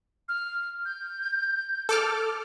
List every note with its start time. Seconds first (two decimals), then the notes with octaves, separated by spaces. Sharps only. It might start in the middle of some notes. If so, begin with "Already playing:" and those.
0.29 F6
0.85 G6
1.89 A4 D6 F6